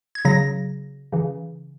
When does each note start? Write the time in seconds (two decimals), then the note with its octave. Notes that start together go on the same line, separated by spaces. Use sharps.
0.15 G#6
0.25 C#3 F#3 A#6
1.12 C#3 E3